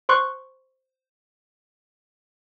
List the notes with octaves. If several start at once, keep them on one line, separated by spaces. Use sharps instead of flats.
C5 C6 C#6 F#6